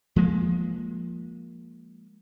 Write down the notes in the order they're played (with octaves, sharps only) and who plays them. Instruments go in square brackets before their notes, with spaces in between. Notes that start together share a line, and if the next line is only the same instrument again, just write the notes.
[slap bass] F3 G#3 A#3